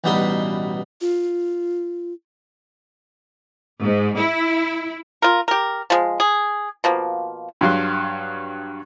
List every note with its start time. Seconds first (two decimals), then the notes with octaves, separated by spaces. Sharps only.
0.04 A1 B2 G3 D#4 B4 C6
1.01 F4
3.82 G#2
4.18 E4
5.22 F4 A#4
5.48 G4 A#4
5.90 F3 G#3
6.20 G#4
6.84 B2 F3 A#3
7.61 G2 F#3 F5 C6